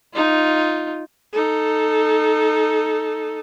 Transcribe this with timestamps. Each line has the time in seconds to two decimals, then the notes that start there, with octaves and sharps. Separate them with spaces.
0.13 D#4 F4
1.33 D#4 A4